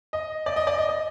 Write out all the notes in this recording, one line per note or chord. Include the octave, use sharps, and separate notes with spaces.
D#5
D5
D#5
D5
D#5
D#5